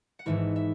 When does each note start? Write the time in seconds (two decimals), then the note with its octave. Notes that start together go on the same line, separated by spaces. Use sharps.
0.19 F#5
0.26 G#1 G#2 E3 E4 E5
0.56 E5